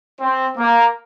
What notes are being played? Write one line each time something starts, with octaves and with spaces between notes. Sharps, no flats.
C4
A#3